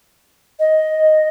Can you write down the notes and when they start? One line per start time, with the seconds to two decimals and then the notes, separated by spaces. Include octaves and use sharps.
0.59 D#5